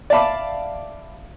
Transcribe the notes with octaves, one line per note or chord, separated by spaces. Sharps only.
D5 E5 F5 A5 B5 D6